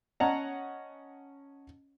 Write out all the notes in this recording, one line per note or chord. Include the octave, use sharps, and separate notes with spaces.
C#4 C#5 D#5 F#5 A5 A#5